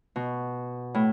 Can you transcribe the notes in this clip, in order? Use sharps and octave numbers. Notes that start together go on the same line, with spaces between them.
B2
A2